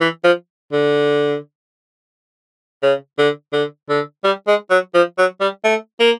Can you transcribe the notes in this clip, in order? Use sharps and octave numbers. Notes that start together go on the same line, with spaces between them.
E3
F3
D3
C#3
D3
D3
D3
G3
G#3
F#3
F3
F#3
G3
A3
A#3